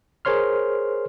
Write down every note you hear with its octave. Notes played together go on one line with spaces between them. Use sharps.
G#4 A#4 C5 C#5 C6 F6